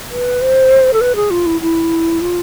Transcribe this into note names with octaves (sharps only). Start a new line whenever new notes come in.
B4
C5
A4
B4
G#4
F4
E4
E4
F4